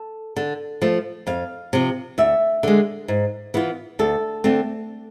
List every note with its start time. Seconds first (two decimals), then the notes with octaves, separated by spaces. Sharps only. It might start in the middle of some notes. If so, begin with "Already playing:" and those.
Already playing: A4
0.36 D3
0.82 F3 A3
1.27 F2 F5
1.73 C3 F3
2.18 D2 E5
2.63 D3 G#3
3.08 G#2
3.54 E3 B3 F4
3.99 D2 A4
4.44 D3 A3 C4